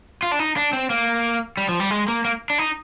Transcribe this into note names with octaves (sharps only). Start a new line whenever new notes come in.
F4
D4
D#4
D4
C4
A#3
G3
F3
G3
G#3
A#3
A#3
D4
D#4